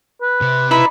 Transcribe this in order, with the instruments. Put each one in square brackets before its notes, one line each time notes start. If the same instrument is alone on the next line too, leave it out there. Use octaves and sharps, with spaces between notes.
[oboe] B4
[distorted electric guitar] C3
[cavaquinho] D#4 D5 B5 [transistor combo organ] E4 B4